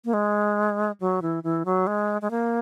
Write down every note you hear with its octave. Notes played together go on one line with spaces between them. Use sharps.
A#3
G#3
F#3
E3
E3
F#3
G#3
G#3
A#3